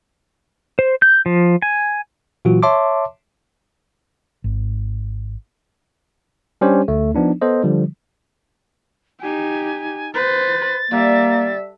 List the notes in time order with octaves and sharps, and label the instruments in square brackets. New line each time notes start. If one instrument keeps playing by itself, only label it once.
[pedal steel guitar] C5
G6
F3
G#5
[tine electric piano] A#2 E3 F#3 F4 F#4
C#5 E5 A5 C6 D6
[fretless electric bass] G#1
[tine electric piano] G3 C#4 D4 G4 C5 C#5
D2 A3
F3 B3 D4 D#4
B3 A4 C5 D#5
D3 F3 G3
[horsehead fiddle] D#4 G4 [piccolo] G#5
[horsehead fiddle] B4 C5 [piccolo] A6
[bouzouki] D3 [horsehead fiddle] G3 E5 [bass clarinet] A#3